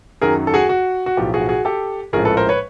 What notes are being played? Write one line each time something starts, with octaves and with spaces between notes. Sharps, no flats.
F#2 D#3 F#3 G#4 A#4
A4
F#4 G#4
F#4
F#4
B1 A2 F3 G4
F#4 G#4
F#4 G#4
G4 A4
A#1 A2 F3 G#3 C#4 G#4 A#4
A4 B4
A#4 C5
B4 C#5